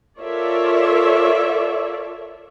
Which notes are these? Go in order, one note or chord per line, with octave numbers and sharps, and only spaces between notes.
F4 A4 A#4 C#5 D5 E5